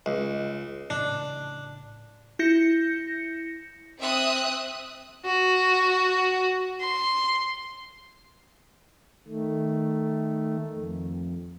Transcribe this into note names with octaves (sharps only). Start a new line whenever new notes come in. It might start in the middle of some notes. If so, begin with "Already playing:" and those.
C#2
A#1 A2 C#3 D4
E4 G6 A#6 C#7
C4 E5 D#6 F#6
F#4
C6
D#3 A3
F2